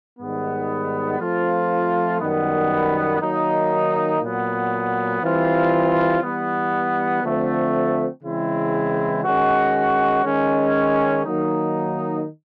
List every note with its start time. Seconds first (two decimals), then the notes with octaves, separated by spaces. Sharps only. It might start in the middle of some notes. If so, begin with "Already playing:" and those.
0.19 G#2 D#3 G3 B3
1.20 F3 A3 C4 F4
2.20 F#2 D#3 G3 B3
3.20 D#3 F#3 A#3 D#4
4.22 A#2 F#3 B3
5.23 E3 G3 C4 F4
6.23 E3 G3 B3
7.23 D3 F3 A3 C4
8.24 C#3 E3 G#3 C4 E4
9.24 D#3 G#3 C#4 F#4
10.25 D#3 G#3 C#4
11.25 D#3 F#3 A#3 D#4